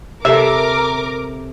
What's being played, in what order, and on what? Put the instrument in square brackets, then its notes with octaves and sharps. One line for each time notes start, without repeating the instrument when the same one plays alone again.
[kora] C3 A4 [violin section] A#4 D6 [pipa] E5